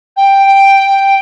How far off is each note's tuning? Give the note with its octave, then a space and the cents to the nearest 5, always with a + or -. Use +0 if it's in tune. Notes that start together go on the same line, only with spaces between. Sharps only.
G5 +0